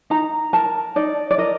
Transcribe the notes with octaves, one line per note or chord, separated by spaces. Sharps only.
D#4 A#5
A#4 A5
D#4 D5
D5
A#4 D#5